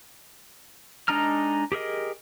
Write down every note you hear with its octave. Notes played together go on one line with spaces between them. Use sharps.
G#3 D4 D#4 A#5 F6
G4 G#4 A#4 D#5